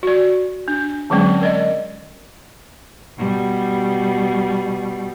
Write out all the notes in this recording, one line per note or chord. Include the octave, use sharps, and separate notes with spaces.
F#4 D5
D4
D3 F#3 G#3 C4 C#4
A#4 D5 D#5
B2 G3